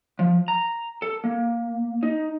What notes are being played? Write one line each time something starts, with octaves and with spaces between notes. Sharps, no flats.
F3
A#5
A4
A#3
D#4